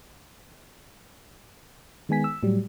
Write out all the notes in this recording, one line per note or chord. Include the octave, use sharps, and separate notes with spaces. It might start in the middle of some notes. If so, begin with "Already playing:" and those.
D#3 G#3 B3 G#5 B6
E6
A2 F#3 G3